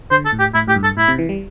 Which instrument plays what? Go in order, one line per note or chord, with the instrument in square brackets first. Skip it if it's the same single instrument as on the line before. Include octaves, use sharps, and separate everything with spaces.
[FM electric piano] D3 [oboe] C5
[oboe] A4
[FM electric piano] A2
[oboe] G4
[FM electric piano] A2 [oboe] E4
[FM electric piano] A2 [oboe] G4
[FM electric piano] G2
[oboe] A4
[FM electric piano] A2 [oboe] E4
[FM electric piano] C3
E3
G3